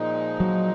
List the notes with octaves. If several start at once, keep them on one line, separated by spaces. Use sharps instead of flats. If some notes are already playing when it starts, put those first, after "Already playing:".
Already playing: A#2 F3 G#3 D#4
F#3